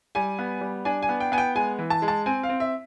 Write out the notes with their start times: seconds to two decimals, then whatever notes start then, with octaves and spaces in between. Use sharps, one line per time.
0.15 G3 G#5
0.39 B3
0.61 G3
0.85 D4 G#5
1.02 G#5
1.09 B3
1.20 G5
1.32 B3 G#5
1.38 G5
1.55 G#3 G#5
1.79 E3
1.90 A5
2.02 G#3
2.08 A5
2.26 C4 G#5
2.43 F5
2.49 C4
2.60 E5